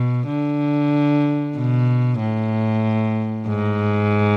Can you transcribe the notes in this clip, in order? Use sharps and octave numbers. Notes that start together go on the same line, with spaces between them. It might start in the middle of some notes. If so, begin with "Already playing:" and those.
Already playing: B2
D3
B2
A2
G#2